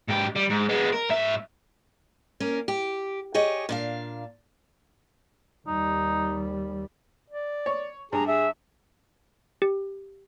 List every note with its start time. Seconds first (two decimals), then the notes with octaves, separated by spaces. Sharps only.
0.08 G#2 G4
0.35 G3
0.50 G#2
0.69 G#3 B3
0.93 A#4
1.10 G#2 E5
2.40 A#3 C#4 A#4
2.68 G4
3.34 G4 G#4 C#5 D#5
3.69 A#2 D4 F5
5.67 D#2 G3 D#4
7.30 D5
7.66 C#5
8.13 G2 G#4 A#5
8.27 G#4 E5
9.62 G4